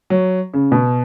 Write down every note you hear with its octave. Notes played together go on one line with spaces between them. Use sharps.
F#3
C#3
B2